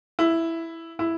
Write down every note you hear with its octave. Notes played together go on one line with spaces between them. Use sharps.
E4
E4